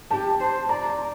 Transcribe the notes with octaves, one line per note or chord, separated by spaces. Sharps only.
G4 A5
C5
D5 A#5